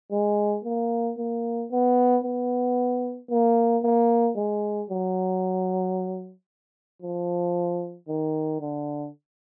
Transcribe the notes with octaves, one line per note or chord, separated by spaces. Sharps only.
G#3
A#3
A#3
B3
B3
A#3
A#3
G#3
F#3
F3
D#3
D3